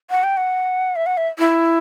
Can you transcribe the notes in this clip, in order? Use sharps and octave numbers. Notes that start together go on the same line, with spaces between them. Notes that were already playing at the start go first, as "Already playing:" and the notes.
F#5
G5
F#5
E5
F#5
E5
E4